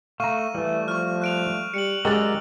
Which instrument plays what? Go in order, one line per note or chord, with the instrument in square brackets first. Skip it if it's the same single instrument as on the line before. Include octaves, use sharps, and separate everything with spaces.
[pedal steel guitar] A3 [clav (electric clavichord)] F5 A#5 [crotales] C#6 D#7
[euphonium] E3 [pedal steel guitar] G3 A3
[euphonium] F3 [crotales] C#6 F6
[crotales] F#6 D7 F7
[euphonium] G3 [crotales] C#7 F#7
[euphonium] F#2 [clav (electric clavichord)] G#3 G4 A#4 [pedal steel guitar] F#4 D5 A#5 [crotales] E6